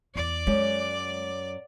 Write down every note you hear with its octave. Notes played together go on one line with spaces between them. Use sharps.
E2 D5
F#2 G#3